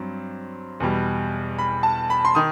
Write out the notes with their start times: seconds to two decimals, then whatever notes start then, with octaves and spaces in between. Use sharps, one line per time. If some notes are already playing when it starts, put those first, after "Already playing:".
Already playing: G2 F#3 C4
0.80 E2 B2 G3
1.58 B5
1.83 A5
2.10 B5
2.25 C6
2.35 D#3 D#6